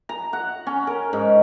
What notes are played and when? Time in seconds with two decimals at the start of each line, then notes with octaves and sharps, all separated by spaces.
0.09 A#5
0.33 F#5
0.67 C#4
0.87 A#4
1.13 G#2